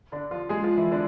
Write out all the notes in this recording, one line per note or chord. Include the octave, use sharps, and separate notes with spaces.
D3 D4
F3 F4
G#3 G#4
F3 F4
E3 E4
D3 D4